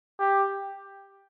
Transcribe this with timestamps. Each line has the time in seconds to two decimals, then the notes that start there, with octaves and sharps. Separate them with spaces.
0.19 G4